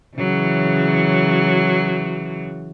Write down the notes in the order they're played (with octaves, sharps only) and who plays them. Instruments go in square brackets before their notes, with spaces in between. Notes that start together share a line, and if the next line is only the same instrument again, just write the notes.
[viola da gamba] C#3 E3 F#3